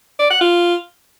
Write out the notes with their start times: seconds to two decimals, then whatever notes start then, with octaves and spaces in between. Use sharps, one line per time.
0.19 D5
0.30 F#5
0.41 F4